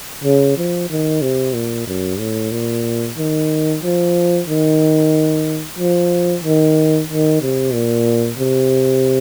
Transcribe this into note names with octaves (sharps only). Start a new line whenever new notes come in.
C#3
F3
D#3
C3
A#2
F#2
A2
A#2
D#3
F3
D#3
F3
D#3
D#3
C3
A#2
C3